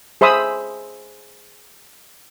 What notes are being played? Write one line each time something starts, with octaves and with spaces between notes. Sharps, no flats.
G#4 C5 E5 B5 D#6 E6